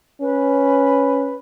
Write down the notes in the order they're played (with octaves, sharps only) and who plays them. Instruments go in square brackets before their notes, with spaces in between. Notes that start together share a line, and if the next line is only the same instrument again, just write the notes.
[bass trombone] C#4 [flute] B4